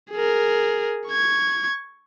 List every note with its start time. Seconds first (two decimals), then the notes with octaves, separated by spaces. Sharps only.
0.12 G#4 A#4
1.08 C#6 G#6